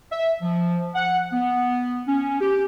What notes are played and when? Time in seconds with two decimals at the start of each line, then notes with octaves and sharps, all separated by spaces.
0.12 E5
0.42 F3
0.95 F#5
1.33 B3
2.08 C#4
2.41 G4